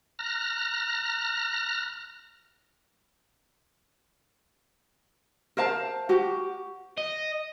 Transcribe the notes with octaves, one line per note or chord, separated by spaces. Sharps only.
A#5 F6 F#6 A#6
A#4 C5 F5 A5
F#4 G4
D#5